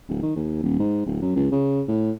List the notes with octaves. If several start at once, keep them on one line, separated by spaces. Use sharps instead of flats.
D1
D#3
D#2
D#1
G#2
D1
F#2
C#2
C#3
A2